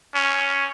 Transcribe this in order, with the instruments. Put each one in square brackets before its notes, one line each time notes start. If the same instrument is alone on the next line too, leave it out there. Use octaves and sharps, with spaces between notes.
[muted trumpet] C#4